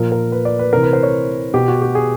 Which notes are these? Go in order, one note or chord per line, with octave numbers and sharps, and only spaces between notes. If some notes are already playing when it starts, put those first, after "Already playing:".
Already playing: A#2 F3 A#4
A#4
B4
D5
B4
C3 E3 A#4
B4
C5
C#5
B2 G4
F#4
G4
G#4